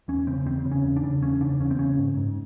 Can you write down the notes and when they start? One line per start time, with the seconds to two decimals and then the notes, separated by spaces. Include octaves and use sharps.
0.08 E2 C#4
0.27 C#3 C4
0.46 E2 C4
0.65 C#3
0.71 C#4
0.84 E2
0.96 D4
1.03 C#3
1.22 E2 C#4
1.41 C#3 D4
1.60 E2 C#4
1.70 C4
1.78 C#3 C#4
1.98 G#2
2.17 G#2